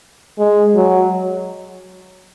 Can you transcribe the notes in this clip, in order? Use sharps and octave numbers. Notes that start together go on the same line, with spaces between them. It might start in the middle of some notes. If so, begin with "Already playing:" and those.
G#3
F#3